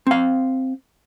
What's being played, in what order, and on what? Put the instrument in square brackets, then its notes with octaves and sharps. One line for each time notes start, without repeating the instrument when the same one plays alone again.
[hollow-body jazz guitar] C4 F5